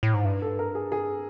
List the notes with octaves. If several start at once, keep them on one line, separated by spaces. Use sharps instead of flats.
A2
G#2
G2
A4
A#4
G#4
G#4